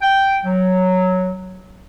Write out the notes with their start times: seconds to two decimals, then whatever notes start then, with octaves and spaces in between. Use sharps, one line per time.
0.02 G5
0.46 F#3